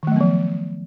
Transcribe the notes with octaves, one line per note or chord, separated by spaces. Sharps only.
D#3 F3 F#3 A3 B3